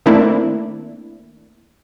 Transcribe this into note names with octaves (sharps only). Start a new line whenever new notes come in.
D#3 A3 A#3 C4 D4 E4